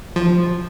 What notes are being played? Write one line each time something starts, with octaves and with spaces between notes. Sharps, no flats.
F3